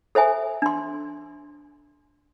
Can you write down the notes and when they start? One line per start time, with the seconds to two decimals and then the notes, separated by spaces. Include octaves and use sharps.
0.15 A4 C5 E5 G#5
0.62 D4 C6